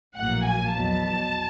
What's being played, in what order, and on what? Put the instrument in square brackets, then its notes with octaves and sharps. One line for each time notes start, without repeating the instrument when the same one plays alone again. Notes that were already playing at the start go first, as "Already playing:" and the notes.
[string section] A#1 A2 F#3 A#3 F#5
G#5
E2 B2 F#3 A5